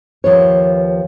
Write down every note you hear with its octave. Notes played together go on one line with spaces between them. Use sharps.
D#2 F3 B4 C#5